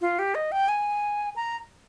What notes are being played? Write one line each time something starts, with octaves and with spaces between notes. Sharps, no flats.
F4
G4
D#5
G5
G#5
A#5